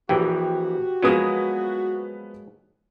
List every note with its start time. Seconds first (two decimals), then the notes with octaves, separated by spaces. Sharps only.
0.09 A#1 E3 F#4 G4
1.03 F3 F#3 G#3 A#3 B3 D#6